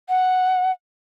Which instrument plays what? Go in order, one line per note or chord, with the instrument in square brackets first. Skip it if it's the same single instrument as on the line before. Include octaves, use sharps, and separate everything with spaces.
[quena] F#5